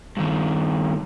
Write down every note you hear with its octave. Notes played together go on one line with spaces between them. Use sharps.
G2 D#3